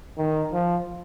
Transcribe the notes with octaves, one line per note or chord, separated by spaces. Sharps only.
D#3
F3